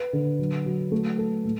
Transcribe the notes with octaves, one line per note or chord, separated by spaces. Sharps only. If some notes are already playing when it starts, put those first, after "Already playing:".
Already playing: B4
D3
F#3
F#3
A3
A4
A2